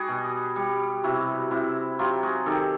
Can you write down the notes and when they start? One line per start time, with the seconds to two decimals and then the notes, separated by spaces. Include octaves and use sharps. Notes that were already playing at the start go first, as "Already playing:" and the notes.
Already playing: G3 F#4 G#4
0.09 B2
0.56 G3
1.04 C3 E4 F#4
1.51 C3 E4 F#4
1.99 F#3 F4 G4
2.23 F#4 G#4
2.46 D#3 G4 A4